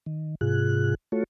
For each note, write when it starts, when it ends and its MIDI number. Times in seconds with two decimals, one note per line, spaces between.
0.06 0.35 51
0.41 0.95 44
0.41 0.95 48
0.41 0.95 65
0.41 0.95 68
0.41 0.95 90
1.12 1.24 57
1.12 1.24 65
1.12 1.24 66
1.12 1.24 69
1.12 1.24 73